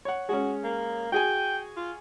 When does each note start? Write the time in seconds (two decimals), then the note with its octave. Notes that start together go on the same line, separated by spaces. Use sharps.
0.05 C#5 F#5
0.29 G#3 C#4 F#4
0.64 A#3
1.12 F#4 G#4 G5 G#5
1.77 F4